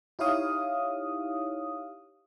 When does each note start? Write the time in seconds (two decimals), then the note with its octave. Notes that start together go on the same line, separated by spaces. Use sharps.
0.19 D#4 E4 G4 C#5 F5 D#6